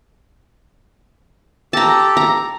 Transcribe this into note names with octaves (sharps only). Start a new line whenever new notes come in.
G4 A4 A5 A#5
A#5